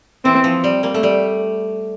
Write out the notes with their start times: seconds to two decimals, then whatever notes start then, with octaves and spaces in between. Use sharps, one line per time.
0.25 E3 C4
0.44 F3
0.64 G3
0.83 G3 A#3
0.94 A3
1.03 G3